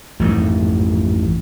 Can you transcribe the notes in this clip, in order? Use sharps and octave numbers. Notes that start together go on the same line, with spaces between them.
A1 F2 G#2